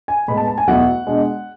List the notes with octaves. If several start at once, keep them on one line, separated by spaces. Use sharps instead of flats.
G#5
A2 G#3 B3 B5
A5
A5
G#5
E2 B2 F#3 A3 E4 F#5
B2 G#3 D4